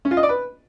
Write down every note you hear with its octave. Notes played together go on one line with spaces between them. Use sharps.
C#4
F4
D#5
D5
B4